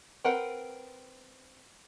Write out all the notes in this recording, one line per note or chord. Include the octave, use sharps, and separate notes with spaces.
C4 A#4 B4 F#5